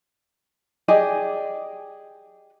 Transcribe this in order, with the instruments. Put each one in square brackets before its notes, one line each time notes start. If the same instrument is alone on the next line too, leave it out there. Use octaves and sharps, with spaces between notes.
[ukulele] G4 G#4 D5 D#5